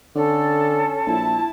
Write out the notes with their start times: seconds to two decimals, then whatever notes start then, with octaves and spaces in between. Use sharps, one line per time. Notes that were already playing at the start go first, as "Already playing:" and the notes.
0.15 D3 C#4 A4
1.06 A#1 E4 A5